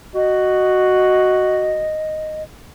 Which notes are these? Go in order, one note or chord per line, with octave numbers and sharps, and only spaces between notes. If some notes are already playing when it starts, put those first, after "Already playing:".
F#4 D#5